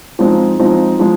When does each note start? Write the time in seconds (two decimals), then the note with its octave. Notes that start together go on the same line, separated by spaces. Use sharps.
0.19 F3 G#3 C4 D#4
0.59 F3 G#3 C4 D#4
0.99 F3 G#3